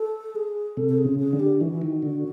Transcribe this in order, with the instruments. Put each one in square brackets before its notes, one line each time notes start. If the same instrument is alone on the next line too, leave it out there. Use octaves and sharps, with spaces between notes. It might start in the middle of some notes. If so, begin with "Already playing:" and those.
Already playing: [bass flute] A4
G#4
[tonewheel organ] C3 [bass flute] A4
[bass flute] A4
G#4
[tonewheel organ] C#3
[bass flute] G#4
[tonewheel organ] D3
[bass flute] G4
[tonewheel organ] E3 [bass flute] F#4
[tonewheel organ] D#3
D3